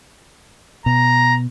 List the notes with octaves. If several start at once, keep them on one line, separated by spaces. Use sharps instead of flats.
B2 A#5